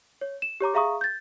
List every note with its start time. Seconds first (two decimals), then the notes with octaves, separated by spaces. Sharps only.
0.21 C#5
0.42 E7
0.60 G4 C#5 A#5 D6
0.74 G#4 E5 F5 A#5 C#6 D#6
1.01 G6 A6